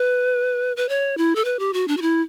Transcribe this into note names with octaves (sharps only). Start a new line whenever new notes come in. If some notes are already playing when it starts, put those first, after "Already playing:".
Already playing: B4
B4
C#5
E4
A4
B4
G4
F#4
D4
F#4
E4